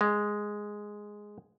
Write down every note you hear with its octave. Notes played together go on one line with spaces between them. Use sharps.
G#3